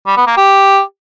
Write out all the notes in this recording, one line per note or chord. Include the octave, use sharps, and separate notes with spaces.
G3
B3
A#3
G4